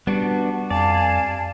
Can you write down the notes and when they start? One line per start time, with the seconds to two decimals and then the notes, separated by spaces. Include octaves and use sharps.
0.07 G3 B3 D4 F#4
0.71 F2 D5 F5 G#5 A5